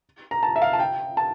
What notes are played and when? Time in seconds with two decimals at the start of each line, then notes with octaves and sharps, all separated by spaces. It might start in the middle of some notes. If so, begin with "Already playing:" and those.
0.31 A#5
0.43 A5
0.56 E5
0.62 F5
0.73 A5
0.80 G5
1.17 A5